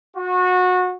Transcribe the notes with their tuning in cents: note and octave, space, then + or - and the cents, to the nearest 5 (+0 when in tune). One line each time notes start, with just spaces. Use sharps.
F#4 -25